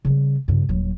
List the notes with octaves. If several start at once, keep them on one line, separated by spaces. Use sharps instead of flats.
C#3 G3
G2 C#3
D#1 F#3